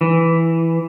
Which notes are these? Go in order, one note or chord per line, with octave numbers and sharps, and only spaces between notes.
E3